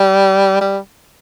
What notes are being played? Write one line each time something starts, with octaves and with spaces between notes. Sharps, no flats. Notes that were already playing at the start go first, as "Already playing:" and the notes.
Already playing: G3
G3